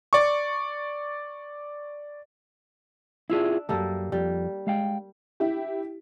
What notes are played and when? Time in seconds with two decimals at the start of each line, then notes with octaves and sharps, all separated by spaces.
0.13 D5 C#6
3.30 D4 E4 F4 G#4 E5
3.69 B1 F#2 G3 A#3 A4
4.12 F2 G3
4.67 G#3 F5 G5
5.40 E4 G4